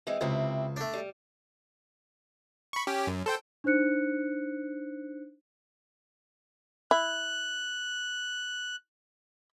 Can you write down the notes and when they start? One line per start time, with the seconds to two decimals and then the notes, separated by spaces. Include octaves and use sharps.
0.07 E3 G#3 C4
0.21 C#2 C3 C4 E4
0.76 A3 D4
0.93 G3
2.73 B5 C#6
2.87 C#4 G4
3.07 F#2
3.26 A4 C5 G5
3.64 D4 D#4 C5 F#6 C#7
6.91 E4 F#6